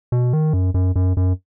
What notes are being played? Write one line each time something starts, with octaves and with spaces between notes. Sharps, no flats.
B2
D#3
F#2
F#2
F#2
F#2